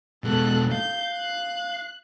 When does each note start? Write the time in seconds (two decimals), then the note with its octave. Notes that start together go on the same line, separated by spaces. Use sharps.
0.24 B2 G#3 A4 F#6
0.72 F5 G6
1.13 F#6